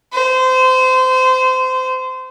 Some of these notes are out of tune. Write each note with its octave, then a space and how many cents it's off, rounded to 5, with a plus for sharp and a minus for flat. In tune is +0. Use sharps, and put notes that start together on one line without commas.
C5 -25